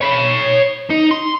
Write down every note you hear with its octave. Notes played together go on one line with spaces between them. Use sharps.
C#5 B5
D#4
C6